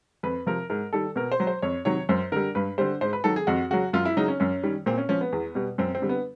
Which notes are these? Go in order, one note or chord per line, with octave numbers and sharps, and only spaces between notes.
F2 B4
C3 F3 A#4
G#2 A#4
D#3 G3 A4
B2 A#4
C5
F#3
C5
F2 C#5
C3 D#3 F#3 C#5
F#2 C5
D3 G3 A#4
G2 B4
D3 G3 C5
G#2 C5
B4
D#3 F#3 A4
G#4
F2 F#4
C#3 F#3 F#4
F#2 F4
E4
C#3 F#3 D#4
C#4
F#2 C#4
D#3 G3
A#2 C4
C#4
F3 C#4
B3
E2
B2 G3
F#2 C4
C4
D3 G3
B3